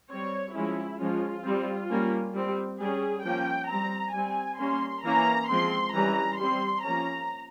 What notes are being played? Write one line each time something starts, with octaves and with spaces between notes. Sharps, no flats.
G3 C4 C#5
F3 G#3 C#4 E4
F3 G#3 C#4 F4
G3 C4
G3 A#3 C#4
G3 C4
G3 C#4 G#4
F3 A#3 C#4 G5
G3 C4 A#5
G3 C4 G#5
G3 A#3 C#4 C6
E3 A#3 C#4 A#5
F3 G#3 C4 C6
E3 G3 C#4 A#5
G3 C4 C6
F3 A#3 C#4 A#5